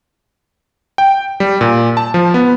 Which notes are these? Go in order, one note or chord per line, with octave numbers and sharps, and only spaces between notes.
G5
G3
A#2
A5
F3
B3